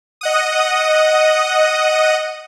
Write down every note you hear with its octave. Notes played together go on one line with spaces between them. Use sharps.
D#5 F#5 D#6